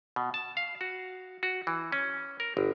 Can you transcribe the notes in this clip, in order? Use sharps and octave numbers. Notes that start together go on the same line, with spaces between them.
B2
A5
F5
F#4
F#4
E3
C#4
A#4
G1